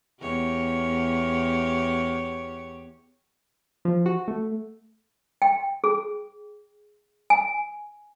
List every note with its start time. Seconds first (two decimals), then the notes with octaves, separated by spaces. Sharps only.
0.20 E2 G4 C#5
3.85 F3
4.06 F#4
4.28 A3
5.42 G5
5.84 G#4
7.30 G#5